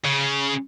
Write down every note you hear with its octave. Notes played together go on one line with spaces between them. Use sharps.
C#3